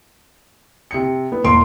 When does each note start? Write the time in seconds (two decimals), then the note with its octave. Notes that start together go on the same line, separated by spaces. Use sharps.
0.91 C3 C#7
1.32 B3
1.44 E1 A#3 C6 D7